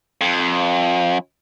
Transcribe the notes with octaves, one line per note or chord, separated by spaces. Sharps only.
F2